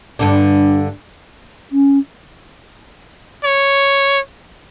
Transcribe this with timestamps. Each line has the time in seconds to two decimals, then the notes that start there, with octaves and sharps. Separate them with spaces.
0.19 G2 D3 D4
1.72 C#4
3.44 C#5